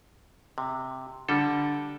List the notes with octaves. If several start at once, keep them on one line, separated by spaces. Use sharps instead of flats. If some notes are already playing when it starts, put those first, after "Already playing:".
C3
D3 G3 A4